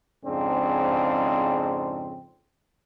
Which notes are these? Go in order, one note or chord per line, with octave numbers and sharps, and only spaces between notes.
F2 G#2 C#3 C4 D4